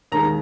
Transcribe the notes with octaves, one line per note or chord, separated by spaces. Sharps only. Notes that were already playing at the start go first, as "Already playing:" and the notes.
D#2 D#3 G#3 A#5